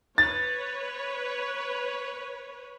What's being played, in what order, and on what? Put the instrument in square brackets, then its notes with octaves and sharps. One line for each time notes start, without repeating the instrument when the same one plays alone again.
[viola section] B4 C#5 [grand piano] A6